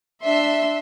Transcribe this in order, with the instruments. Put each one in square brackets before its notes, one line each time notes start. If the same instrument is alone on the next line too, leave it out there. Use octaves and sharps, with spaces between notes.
[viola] D4 C6 [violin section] E5